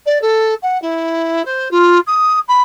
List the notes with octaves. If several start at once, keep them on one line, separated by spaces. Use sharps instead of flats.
D5
A4
F#5
E4
C5
F4
D#6
B5